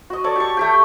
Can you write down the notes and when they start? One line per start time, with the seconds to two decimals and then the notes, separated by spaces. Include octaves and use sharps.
0.10 F#4 D#5
0.24 A4 C#5 D5
0.36 G4 A5 C#6
0.57 A3 G4 G5